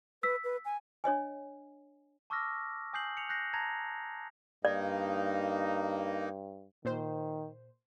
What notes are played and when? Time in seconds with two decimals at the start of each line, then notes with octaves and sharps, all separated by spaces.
0.23 B4 E6 B6
0.44 B4
0.65 G#5
1.04 D4 C#5 D#5 G#5
2.30 A5 C#6 D6 E6 F6 A#6
2.93 G#5 D#6 G6 C7 F#7
3.17 C#7 F7
3.29 F#6 G6 A#6 C7
3.53 A5 A#5 G#6 A#6 F7
4.65 G2 A#3 D#4 D5
6.85 A#2 D#3 C5